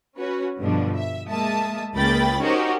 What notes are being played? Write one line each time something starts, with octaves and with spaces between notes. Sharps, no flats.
C#4 F#4 B4 C#5
G2 B2 D3 F3 G3 D4
E5
G#3 A#3 E5 A5 D#6
C#2 C#3 A#3 G5 B5 A6
C#4 D#4 F#4 G4 A#4 C5